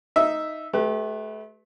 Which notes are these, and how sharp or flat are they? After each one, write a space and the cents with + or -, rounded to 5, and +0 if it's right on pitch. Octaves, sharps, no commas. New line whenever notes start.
D#4 +5 E5 +0
A3 -35 G4 -10 B4 +5